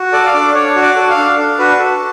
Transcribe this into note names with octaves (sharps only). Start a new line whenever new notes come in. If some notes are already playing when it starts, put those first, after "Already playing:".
Already playing: F#4
A4 D5
F5
D4 D5
D4 C#5
F#4
D5
A4
F5
D4
D4
F#4 B4
A4